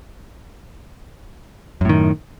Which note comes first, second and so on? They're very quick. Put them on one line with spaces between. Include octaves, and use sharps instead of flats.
F#2 A2 D#3